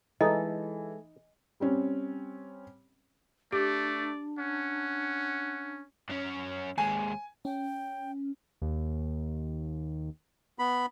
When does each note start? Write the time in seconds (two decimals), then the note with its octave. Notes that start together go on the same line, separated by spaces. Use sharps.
0.21 E3 G#3 D#4 A4 D#5
1.60 G3 C4 C#4
3.52 A3 D4 G4 D5
4.38 C#4 F#5
6.09 F#2 C#4
6.78 D#2 G#3 G#5
7.45 C#4 G5
8.62 D#2
10.59 B3 B5